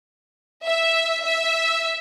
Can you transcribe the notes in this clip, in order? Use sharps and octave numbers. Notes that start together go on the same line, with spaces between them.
E5
E5